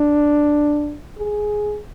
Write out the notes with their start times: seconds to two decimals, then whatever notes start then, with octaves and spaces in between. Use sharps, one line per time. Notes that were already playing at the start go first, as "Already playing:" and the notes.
Already playing: D4
1.18 G#4